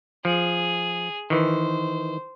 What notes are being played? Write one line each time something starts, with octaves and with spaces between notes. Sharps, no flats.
F3 G#4
D#3 E3 C5